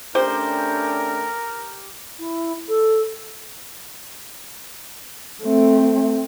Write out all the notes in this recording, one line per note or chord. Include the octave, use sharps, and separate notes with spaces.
A3 C#4 D4 G4 A#4 C5
E4
A4
A3 C4